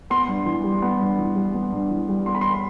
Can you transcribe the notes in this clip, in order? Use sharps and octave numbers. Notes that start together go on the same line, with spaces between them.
B3 C6
G2
E3
G3
B3
G2
E3
G3
B3
G2
E3
G3
B3 C6
B5
C6